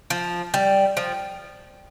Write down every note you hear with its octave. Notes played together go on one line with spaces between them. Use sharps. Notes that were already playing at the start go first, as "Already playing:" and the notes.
F3
G3
F3